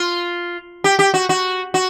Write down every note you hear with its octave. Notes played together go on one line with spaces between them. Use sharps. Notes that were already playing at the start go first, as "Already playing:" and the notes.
Already playing: F4
G4
G4
F#4
F#4
F#4